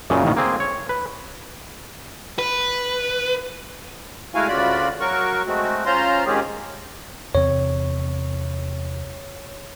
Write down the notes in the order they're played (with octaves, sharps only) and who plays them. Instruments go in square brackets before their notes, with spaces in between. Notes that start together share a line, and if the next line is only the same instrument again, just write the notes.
[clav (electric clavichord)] F#2 A#2 C#3
A1 D#2 B2 D#3
A#3 C4 G#4
C#5
B4
[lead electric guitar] B4
[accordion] G#3 A3 E4 F#4 F5 G#5
D2 C#3 F4 F#4 D5 B5
F#3 F#4 A#4 C#6
G#3 A3 C4 F#4
C#4 F4 C5 A#5 C6
D#3 G#3 C4 C#4 G4 G#4
[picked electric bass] E2 C3 C4 [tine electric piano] C#5